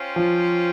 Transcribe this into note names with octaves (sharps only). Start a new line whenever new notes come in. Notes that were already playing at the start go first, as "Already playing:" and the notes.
Already playing: C#4 F4 C5 G5
F3